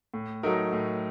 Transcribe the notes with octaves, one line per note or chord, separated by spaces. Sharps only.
A2
F#3 A3 D#4 A#4
A2